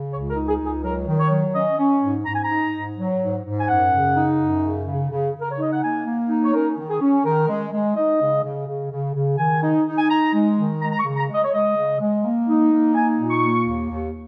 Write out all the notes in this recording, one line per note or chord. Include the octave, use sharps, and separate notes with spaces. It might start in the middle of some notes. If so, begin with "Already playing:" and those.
Already playing: C#3
C#2 C#5
A#4
D#4
G#4
C#2
G#4
F#3 A#4
D#3
C#5
F#3
C#4 D#5
C#4
G#2
G#2 A#5
G#5
A#5
D#4
G#2
F#3
G#2
G#2
G#5
F#2 F#5
C#3
D#4
F#2
C#3
C#3
C#3
C#3
A#4
C#5
D#4 D#5
F#5
A#3 G#5
A#3
D#4
C#5
C#4 A#4
D#3
G#4
C#4
D#3 A#4
G#3
G#3
D#4 D#5
C#3
C#3
C#3
C#3
C#3
D#3 G#5
D#4
D#4
G#5
D#4 A#5
G#3
D#3
G#3 A#5
A#5
C#6
C#3
A#5
G#3
D#5
C#5
G#3 D#5
C#3
G#3
A#3
D#4
A#3
D#4 G#5
A#2
C#6
A#3
D#2
D#2